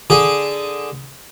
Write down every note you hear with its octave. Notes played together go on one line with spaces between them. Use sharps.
D3 G#4